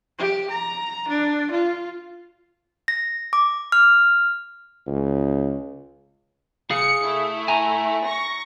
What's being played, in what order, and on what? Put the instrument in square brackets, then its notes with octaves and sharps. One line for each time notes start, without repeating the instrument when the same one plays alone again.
[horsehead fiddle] G4
A#5
D4
F4
[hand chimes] A#6
D6
F6
[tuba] C#2
[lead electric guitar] G#4 F5 [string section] C#7
[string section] A3 E4
[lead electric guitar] G#5 A#5
[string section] C#6 A#6